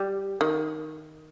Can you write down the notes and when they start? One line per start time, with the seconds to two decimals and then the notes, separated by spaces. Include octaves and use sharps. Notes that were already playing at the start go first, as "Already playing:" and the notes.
Already playing: G3
0.41 D#3